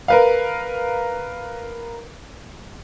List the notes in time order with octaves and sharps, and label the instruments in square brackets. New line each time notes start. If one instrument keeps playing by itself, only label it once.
[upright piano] A#4 B4 F5